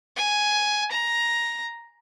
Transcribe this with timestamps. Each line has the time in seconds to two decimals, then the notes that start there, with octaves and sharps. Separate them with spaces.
0.17 G#5
0.91 A#5